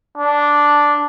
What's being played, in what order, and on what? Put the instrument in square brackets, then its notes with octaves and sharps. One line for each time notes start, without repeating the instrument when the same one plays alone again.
[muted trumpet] D4